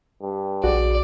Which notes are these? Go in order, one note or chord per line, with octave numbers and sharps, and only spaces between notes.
G2
A#1 F#4 G#4 D5